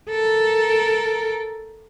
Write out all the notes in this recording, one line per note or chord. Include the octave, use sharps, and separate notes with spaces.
A4 A#4